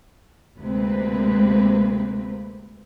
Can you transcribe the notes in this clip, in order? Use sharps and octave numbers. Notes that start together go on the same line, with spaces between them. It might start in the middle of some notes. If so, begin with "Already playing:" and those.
D2 C3 G#3 A#3 C4 B4